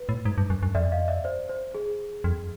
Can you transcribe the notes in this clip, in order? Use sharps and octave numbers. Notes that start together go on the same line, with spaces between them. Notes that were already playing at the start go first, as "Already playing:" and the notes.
Already playing: B4
A2
G#2
G2
F#2
F#2
F2 D5 E5
D#5 F5
D5 E5
C5 D5
C5
G#4
F2